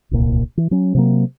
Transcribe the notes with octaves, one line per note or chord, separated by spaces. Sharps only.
D1 C2 A#2
E3
F#3 C#4
C3 F#3 A#3